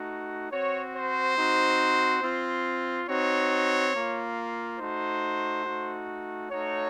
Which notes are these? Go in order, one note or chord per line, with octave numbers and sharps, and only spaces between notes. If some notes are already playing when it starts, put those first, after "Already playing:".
Already playing: A3 D#4 F#4
C4 F#4 C#5
C5
C4 D#4 F#4
C4 F4
C4 D#4 F#4 C#5
A#3 F4
A3 D#4 F#4 C5
A3 D#4 F#4
A3 D#4 F#4 C#5